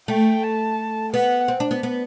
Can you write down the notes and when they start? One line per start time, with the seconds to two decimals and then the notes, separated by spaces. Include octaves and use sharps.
0.08 A3 G5
0.43 A5
1.13 B3 F#5
1.48 C4
1.60 D4
1.71 B3
1.83 B3